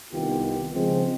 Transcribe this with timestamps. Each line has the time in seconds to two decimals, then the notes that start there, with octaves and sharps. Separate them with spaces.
0.13 C2 D#3 B3 F4 G4
0.74 C#3 F3 G#3 C4